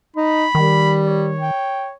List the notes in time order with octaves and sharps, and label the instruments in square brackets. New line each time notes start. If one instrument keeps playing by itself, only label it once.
[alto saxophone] D#4 [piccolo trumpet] B5
[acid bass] D#3 [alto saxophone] G3
[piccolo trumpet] C#5
[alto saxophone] G5